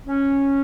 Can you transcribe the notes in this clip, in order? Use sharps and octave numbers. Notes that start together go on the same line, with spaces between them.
C#4